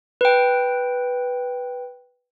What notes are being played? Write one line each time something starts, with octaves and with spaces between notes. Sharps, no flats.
B4 G5